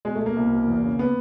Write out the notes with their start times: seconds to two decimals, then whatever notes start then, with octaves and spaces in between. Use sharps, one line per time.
0.05 B2 G#3
0.15 A3
0.20 B2
0.26 A#3
0.36 C2
0.52 B2
0.68 E2
0.84 C#3
0.99 B3